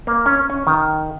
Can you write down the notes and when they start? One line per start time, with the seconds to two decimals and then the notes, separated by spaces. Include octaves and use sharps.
0.07 A#3
0.26 C#4
0.50 C#4
0.67 D#3